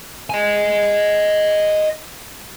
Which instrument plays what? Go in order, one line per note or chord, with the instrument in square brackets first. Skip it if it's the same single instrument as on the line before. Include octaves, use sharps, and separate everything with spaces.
[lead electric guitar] D#5 G#5